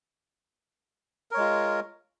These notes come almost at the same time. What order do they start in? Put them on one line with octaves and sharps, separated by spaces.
A#4 C#5 G#3 F4